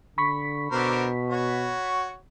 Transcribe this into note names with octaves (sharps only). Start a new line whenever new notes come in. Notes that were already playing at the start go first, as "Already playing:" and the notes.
D3 B5 C#6 B6
B2 D3 A#4 C5
F#4 C#5